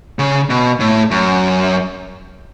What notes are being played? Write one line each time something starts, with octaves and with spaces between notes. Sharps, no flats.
C#3
B2
A2
F#2